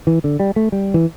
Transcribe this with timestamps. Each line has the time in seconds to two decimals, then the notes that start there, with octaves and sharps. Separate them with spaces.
0.07 E3
0.24 D3
0.40 G3
0.56 A3
0.72 G3
0.94 E3